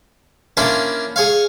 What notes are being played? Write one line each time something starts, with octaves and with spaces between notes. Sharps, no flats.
A#3 C#4 D4 E4 F4 C5
G#4 C#5 F5